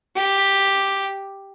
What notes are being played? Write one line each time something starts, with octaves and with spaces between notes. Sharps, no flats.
G4